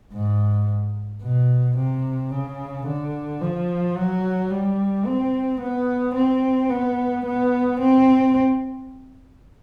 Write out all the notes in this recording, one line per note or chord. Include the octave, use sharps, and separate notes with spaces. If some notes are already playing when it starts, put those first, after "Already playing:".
G#2
B2
C3
C#3
D3
F3
F#3
G3
C4
B3
C4
B3
B3
C4